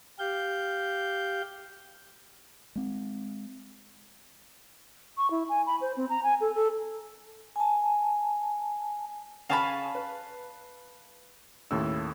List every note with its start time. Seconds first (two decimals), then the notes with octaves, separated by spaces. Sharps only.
0.19 G4 F5 G6
2.76 G#3 C4
5.18 C#6
5.31 E4
5.49 G#5
5.66 B5
5.81 C5
5.97 C4
6.09 A#5
6.23 G#5
6.41 A4
6.55 A4
7.56 G#5 A5
9.50 C#3 F5 G#5 A5 B5 C#6
9.95 B4
11.71 D#2 A2 C#3 E6